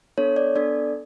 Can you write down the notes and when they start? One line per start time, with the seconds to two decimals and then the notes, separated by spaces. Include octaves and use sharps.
0.18 B3 D4 A4 C#5
0.36 D5
0.55 B3 D4 A4 D5